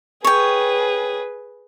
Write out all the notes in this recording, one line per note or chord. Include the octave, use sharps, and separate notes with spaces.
G#4 B4 C#5 G5